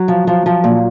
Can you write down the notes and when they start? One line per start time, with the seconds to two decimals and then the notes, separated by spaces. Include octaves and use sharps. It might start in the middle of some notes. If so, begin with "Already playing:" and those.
Already playing: F#3
0.08 F3
0.27 F3
0.46 F3
0.64 A#2